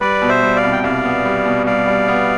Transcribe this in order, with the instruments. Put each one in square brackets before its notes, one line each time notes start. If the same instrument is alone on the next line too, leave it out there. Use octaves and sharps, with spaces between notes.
[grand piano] G3 [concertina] B4 D5
[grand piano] B2
[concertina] C5 E5
[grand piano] G3
[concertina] D5 F5
[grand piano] C2
[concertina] G5
[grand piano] C2 [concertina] D5 F5
[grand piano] B3
G3
B2
[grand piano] G3 [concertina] D5 F5
[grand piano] G3
B3